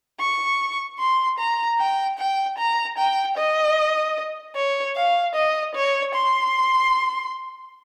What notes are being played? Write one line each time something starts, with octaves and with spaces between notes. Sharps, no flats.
C#6
C6
A#5
G5
G5
A#5
G5
D#5
C#5
F5
D#5
C#5
C6